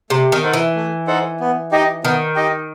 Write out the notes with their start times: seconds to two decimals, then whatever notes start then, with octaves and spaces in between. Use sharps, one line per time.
0.10 C3 A3
0.32 D#3
0.43 D#4 A4 C5 F#5
0.54 E3
0.75 A3
1.07 D#4 A4 C5 F#5
1.40 B3
1.71 D#4 G4 D#5 G5
2.04 D#3 B3
2.36 D#4 G4 D#5 G5